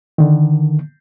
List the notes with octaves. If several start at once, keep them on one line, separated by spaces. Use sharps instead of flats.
D3 D#3